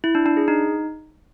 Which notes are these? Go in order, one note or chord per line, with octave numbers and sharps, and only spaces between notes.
E4
D4
D4
G#4
D#4